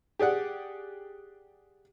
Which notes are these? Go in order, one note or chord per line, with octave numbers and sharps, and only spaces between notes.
G4 G#4 D5 F#5